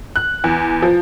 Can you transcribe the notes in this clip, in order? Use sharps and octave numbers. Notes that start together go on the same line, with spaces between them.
F#6
E2
F3